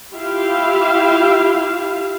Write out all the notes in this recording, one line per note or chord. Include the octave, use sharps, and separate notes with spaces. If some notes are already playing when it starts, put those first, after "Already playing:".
E4 F4 G4 E5 F5